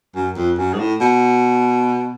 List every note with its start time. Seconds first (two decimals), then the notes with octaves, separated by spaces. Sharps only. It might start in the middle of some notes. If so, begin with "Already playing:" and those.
0.15 F#2
0.37 F2
0.58 F#2
0.74 G#2
0.79 A2
1.01 B2